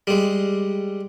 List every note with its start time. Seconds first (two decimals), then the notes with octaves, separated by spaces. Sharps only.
0.07 G3 G#3